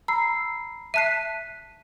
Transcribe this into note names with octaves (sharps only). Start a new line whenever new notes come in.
A#5 B5 E6 C7
E5 A5 F#6 B6 C7 D#7